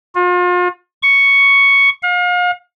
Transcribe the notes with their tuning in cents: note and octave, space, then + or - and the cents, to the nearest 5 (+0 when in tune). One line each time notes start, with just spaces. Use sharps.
F4 +40
C#6 +5
F5 +40